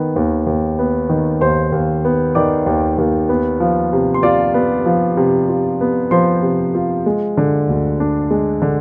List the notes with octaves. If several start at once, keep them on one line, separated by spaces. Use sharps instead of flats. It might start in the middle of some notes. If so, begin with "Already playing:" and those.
Already playing: D#3 B3
D#2
D#2
B3
D#3
D#2 C5 C6
D#2
B3
D#3 D5 D6
D#2
D#2
B3
F3
C3
C6
F4 D5 D6
B3
F3
C3
F4
B3
F3 C5 C6
C3
F4
G#3
D3
D2
D4
G#3
D3